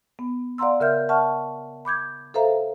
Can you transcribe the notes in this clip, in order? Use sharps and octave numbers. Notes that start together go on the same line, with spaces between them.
B3
D5 F5 F#5 A#5 C6 E6
C#3 A#4 E5 F6 G6
E5 F#5 A5 C#6 F6
B5 D6 G6 G#6
A4 B4 C5 E5 F5 A#5